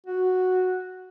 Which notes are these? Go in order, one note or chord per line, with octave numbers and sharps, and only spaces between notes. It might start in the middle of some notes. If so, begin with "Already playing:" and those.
F#4